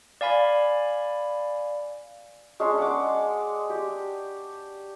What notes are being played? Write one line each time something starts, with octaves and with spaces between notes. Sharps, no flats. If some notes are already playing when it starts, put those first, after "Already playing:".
D5 F5 G#5 B5
G#3 C#4 D4 C6
F#5 D6
G4